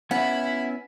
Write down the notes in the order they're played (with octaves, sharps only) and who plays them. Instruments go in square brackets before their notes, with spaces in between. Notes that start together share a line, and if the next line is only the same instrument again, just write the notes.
[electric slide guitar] B3 C#4 [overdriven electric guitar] E4 E5 [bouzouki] F#5 [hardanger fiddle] B5